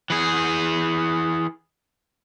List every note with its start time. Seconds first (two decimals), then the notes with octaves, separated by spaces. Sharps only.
0.10 E3 G#4